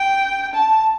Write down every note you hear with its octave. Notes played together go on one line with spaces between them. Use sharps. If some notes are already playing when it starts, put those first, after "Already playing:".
Already playing: G5
A5